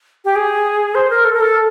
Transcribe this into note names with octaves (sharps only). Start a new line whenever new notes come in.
G4
G#4
C5
A#4
A4
A#4
A4